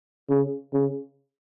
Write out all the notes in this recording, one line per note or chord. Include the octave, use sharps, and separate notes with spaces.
C#3
C#3